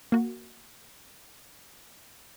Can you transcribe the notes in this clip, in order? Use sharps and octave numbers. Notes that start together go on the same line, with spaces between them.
A#3 F#4